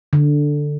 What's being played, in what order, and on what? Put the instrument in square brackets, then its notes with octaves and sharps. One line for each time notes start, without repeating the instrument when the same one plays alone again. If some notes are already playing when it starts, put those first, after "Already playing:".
[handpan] D3